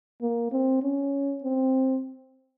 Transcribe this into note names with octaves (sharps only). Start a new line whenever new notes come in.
A#3
C4
C#4
C4